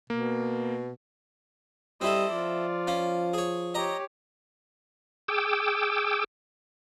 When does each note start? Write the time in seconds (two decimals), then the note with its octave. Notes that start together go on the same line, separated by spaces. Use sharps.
0.10 B2 A#3
2.01 G3 C4 E4 A4 D#5
2.32 F3 F4 D5
2.87 C#4 F5
3.34 G#4 C#5
3.75 G4 C#5 D#5 A#5
5.28 G#4 G5 D6 E6